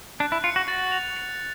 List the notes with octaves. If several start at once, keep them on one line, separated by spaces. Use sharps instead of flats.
D4 F#6
E4
F4 C#7
F#4
F#4 A6
F7
C#7